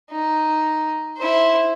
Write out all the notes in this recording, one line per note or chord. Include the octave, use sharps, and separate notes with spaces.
D#4
E4 C5